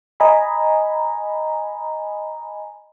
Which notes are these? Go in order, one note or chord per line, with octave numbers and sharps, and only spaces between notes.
D#5 G#5 A#5 B5